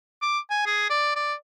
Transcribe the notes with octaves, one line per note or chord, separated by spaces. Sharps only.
D6
G#5
G#4
D5
D5